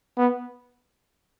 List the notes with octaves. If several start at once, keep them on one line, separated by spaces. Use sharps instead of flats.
B3